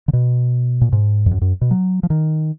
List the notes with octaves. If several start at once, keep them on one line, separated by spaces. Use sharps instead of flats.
D3
B2
A#2
G#2
F2
F#2
F#2
B2
F#3
F3
D#3